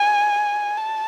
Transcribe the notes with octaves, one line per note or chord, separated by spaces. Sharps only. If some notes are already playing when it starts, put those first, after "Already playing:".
Already playing: G#5
A5